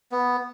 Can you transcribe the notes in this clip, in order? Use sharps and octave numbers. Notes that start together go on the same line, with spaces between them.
B3